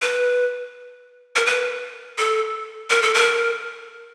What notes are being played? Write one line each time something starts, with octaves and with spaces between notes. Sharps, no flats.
B4
A#4
B4
A4
A#4
A4
A#4